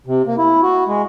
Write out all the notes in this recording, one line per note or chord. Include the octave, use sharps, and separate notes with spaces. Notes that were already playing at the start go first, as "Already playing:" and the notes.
C3
A#3
E4
F#4
G#3